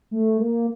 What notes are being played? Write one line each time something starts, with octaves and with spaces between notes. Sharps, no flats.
A3
A#3